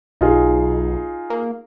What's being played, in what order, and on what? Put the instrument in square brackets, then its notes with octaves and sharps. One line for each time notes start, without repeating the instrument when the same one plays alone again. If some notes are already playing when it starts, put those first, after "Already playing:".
[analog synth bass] B1 [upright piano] D#4 F4 G#4
[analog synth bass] A#3